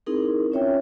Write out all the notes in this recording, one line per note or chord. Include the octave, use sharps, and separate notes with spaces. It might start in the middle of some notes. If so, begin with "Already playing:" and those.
C4 D#4 E4 G#4 A#4
C#4 F4 C#5 E5 G5